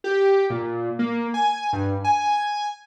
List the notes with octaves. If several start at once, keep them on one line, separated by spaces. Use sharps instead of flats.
G4
A#2
A#3
G#5
G2
G#5